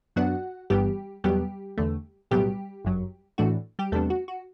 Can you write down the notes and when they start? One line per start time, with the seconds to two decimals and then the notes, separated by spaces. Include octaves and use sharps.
0.16 F#2 F#3 B3 D4 F#4 F#5
0.70 G1 G2 E3 G3 B3 G4
1.24 E2 B2 F#3 G3 B3 G4
1.78 E2 D3 A3
2.31 B1 A2 F#3 G3 B3 G4
2.85 G1 F#2 F#3
3.38 A2 E3 A3 D4 F#4
3.79 G3 G4
3.92 E2 C3 G3 A3 B3 D4 A4
4.10 F#4
4.28 F#4